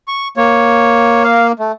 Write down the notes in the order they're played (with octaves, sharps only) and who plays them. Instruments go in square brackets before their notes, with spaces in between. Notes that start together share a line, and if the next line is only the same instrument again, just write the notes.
[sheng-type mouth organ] C#6
[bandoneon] A#3 [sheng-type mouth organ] C#5
[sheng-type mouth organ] F5
A3